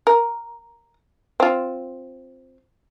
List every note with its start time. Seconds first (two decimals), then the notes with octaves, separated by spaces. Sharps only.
0.07 A#4
1.40 C4 F4